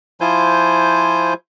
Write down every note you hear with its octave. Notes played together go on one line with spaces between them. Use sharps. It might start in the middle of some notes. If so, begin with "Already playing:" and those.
F3 E4 F4 C5 G#5 G6